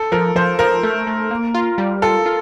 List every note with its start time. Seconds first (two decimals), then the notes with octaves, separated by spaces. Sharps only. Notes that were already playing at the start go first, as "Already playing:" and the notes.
Already playing: A4
0.12 F3 A#4
0.35 F3 C5
0.59 F3 A#4
0.83 A3
1.07 A3
1.31 A#3
1.54 F4
1.78 G3
2.02 F4 A4
2.26 F4